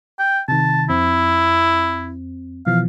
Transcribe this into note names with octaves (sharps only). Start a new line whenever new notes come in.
G5
C3 D#3 A5
F2 C4 E4
B2 E3 F3 F5